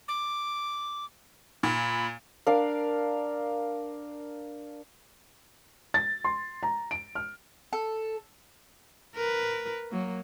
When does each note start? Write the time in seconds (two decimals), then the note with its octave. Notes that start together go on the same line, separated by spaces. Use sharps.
0.08 D6
1.63 A#2 B5
2.47 D4 A#4 D5 F5
5.94 A6
6.24 C6
6.63 A#5
6.91 D7
7.15 F6
7.73 A4
9.15 A#4 B4
9.91 F#3 A#3